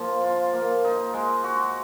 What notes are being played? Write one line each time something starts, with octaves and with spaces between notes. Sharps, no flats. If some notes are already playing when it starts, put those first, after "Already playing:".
Already playing: F3 A#3
F4
A#3
D#4
G#3
F#4